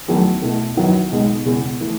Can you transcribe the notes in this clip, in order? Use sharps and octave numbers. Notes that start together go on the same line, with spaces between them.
E2 D#3 F#3 A3 D#4
B2 A3 E4 A4
F#2 D#3 F#3 B3 E4
B1 B2 G#3 D#4
E1 E2 C#3
E3 A3